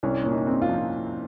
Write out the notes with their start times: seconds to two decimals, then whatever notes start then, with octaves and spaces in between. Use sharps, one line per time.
0.03 C2 C#4
0.23 A#2 C#4
0.33 D#4
0.47 C4
0.62 F4
0.69 F3